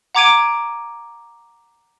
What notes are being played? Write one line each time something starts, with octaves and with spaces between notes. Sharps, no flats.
F#5 A#5 D6 G#6 D7 D#7